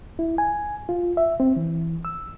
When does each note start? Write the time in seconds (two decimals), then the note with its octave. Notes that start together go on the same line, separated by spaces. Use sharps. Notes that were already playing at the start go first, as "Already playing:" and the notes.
0.19 E4
0.38 G#5
0.89 F4
1.17 E5
1.40 C4
1.56 E3
2.05 E6